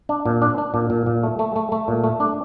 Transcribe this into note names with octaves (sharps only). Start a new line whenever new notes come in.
D4
A#2
D4
D4
A#2
A#2
A#2
A3
A3
A3
A3
A#2
A3
D4